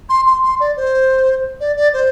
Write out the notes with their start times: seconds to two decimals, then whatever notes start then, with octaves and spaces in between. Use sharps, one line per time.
0.09 C6
0.27 C6
0.43 C6
0.60 D5
0.77 C5
1.60 D5
1.77 D5
1.94 C5